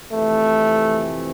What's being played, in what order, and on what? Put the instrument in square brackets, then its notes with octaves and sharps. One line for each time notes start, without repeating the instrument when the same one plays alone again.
[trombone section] F2 C3 E3 A3